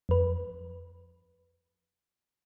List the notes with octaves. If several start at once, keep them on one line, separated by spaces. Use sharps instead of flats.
F2 B4